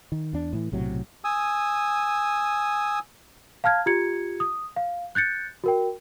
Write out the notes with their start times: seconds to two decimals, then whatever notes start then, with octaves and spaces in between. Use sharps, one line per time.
0.12 D#3
0.33 E2 D4
0.53 A2 E3
0.72 B1 A2 C3 F#3
1.24 G#5 D#6 E6
3.64 F5 A5 F6 G#6
3.86 F4 G4 G#6 C#7
4.40 D#6
4.76 F5
5.15 F#6 G6 A6 C#7
5.64 F#4 A#4 G5